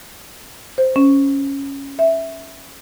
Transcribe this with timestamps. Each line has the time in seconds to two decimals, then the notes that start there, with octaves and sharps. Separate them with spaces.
0.78 C5
0.96 C#4
1.99 E5